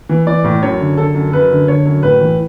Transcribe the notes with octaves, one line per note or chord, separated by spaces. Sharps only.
E3
E3 D5
A2
F#2 C#5
D3
D3 A4
F#2
F#2 B4
D3
D3 C#5
F#2
A2 B4
E3